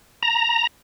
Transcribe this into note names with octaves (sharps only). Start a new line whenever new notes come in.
A#5